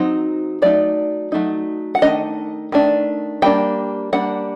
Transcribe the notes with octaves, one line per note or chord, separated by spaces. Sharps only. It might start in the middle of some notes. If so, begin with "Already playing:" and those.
Already playing: F#3 C4 D#4
F#3 A3 D#4 D5
F#3 A3 D#4
F#5
D#3 A3 D4 D#5
D#3 A3 D4
G3 A#3 D4 G5
G3 A#3 D4 F#5